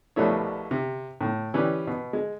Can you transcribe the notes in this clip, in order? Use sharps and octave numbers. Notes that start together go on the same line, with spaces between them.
A#1 B2 G3 A3 E4 C#5
C3
A2
E3 C#4 G4 B4 D5
B2
G#3